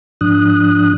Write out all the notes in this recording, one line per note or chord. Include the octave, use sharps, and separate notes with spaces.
G#2 F3 D4 D#6 F#6